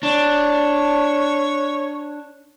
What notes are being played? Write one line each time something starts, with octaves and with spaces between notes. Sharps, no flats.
D4 C#5